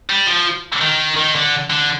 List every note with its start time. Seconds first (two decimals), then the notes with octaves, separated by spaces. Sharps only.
0.10 G3
0.27 F3
0.82 D#3
1.17 D#3
1.35 D3
1.70 D3